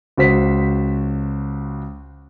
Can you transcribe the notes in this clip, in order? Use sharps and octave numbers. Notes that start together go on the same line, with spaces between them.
C#2 F#4 C5 B6